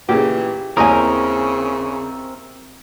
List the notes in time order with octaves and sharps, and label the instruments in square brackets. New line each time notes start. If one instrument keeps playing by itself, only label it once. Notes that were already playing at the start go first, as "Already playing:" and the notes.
[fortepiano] A#2 C#3 [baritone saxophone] E3 [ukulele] G4
[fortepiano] D#2 A#5 D#6 [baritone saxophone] C#3 [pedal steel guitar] C4 A#4 [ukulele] E4 G#5